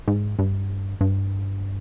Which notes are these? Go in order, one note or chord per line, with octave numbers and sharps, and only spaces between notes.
G#2
G2
G2